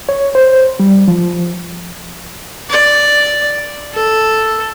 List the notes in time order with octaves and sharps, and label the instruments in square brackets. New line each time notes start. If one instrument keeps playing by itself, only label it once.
[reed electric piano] C#5
C5
G3
F3
[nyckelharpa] D5
A4